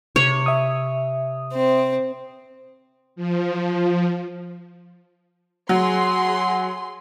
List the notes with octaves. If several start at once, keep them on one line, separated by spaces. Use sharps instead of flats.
C3 C#5
E5 D#6
C4
F3
F#3 G#4 C6